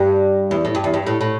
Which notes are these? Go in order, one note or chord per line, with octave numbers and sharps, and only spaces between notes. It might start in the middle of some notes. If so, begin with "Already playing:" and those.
Already playing: G2
E2
A2
G2
E2
G2
A2
A2